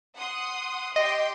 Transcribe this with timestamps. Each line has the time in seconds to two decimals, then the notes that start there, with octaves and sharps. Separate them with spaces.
0.16 F#5 C6 D#6
0.96 G4 D#5 G5 C6